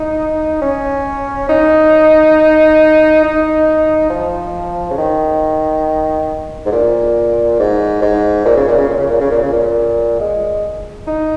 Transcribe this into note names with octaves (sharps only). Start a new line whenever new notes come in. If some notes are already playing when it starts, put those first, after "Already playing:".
Already playing: D#4
C#4
D#4
D#4
F3
C#3
D#3
G#2
A#2
G#2
G#2
A#2
C#3
A#2
C#3
A#2
C#3
A#2
C#3
A#2
C#3
A#2
G#3
D#4